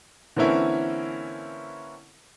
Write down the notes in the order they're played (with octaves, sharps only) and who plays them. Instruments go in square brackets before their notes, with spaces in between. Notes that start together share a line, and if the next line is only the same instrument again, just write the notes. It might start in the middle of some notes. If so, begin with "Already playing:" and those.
[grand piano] D3 E3 A#3 C4 C#4 E4